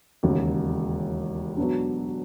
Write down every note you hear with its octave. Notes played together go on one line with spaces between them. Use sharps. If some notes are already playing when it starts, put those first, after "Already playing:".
E1 D#2 C#3
B2 F#3 B3 D4